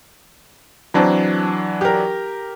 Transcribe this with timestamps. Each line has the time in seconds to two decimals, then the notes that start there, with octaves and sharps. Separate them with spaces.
0.94 E3 F#3 C4 D4 A5 A#5
1.81 G4 A#4